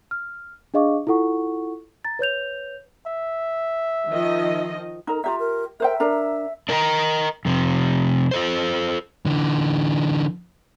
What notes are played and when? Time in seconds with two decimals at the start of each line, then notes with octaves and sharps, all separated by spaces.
0.11 F6
0.74 D4 G#4 D#5 F5 C#6 D6
1.07 E4 F4 A4 F#5 C#6
2.05 A#5 A6
2.19 B4 C#5 G6 F7
3.07 E5
4.08 D#3 F3 D#5
5.07 D#4 A#4
5.24 F4 G4 E5 A#5
5.39 A#4
5.80 A#4 C5 E5 G5
6.00 D4 A#4 A#5
6.69 D4 A#4 D#5 F#5 G5 A#5
7.45 F2 C3 F3
8.31 F4 A4 C5
9.26 D3 E3